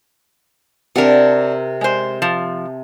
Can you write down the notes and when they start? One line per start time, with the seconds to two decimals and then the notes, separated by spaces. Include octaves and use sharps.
0.96 C3 D4 A#4 F#5
1.81 G#3 C5
2.22 F3